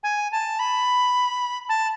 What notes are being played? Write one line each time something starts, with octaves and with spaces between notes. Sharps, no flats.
G#5
A5
B5
A5